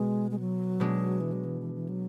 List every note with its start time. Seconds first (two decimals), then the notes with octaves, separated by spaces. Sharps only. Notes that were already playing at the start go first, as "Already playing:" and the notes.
Already playing: B2 G#3
0.31 G#3
0.40 F#3
0.80 B2 G#3 D4
1.21 E3
1.32 F#3
1.45 E3
1.61 E3
1.74 E3
1.89 F#3